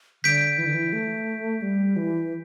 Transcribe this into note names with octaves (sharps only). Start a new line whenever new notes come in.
D3 G6 B6 D7
E3
D3
E3
A3
G3
E3